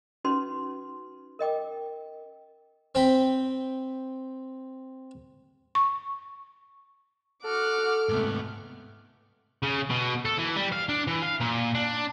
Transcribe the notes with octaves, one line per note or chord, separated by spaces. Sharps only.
C#4 D#4 F#4 B4 C6
A#4 D#5 G5 D6
C4 G5 B5
C#6
F#4 A4 F#5 D6 F6
G#2 C3 A3 B3
C#3
B2
A4
E3
G3
F5
D4
E3
F5
A#2
D4